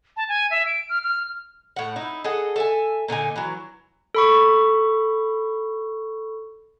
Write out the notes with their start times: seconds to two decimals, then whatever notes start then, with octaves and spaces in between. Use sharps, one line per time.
0.17 A5
0.29 G#5
0.51 E5
0.66 D7
0.89 F6
1.04 F6
1.76 A2 F#5
1.96 D#4 E4
2.24 G#4 A4 D#5 F#5
2.56 A4 E5 G#5
3.08 A#2 D3 D#4 G#5
3.36 E3 F#3
4.15 A4 B5 C#6